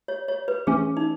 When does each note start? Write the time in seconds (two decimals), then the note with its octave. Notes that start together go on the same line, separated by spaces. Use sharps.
0.08 C#5
0.28 C#5
0.48 B4
0.67 E3 A3 C#4 G#4
0.97 D#4